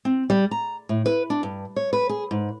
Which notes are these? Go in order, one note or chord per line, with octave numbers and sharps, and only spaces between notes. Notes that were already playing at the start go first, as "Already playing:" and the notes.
C4
G3
A#5
A2
B4
D4
G2
C#5
B4
G#4
G#2